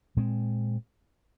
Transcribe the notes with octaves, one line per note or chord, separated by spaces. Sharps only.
A#2 G#3 C4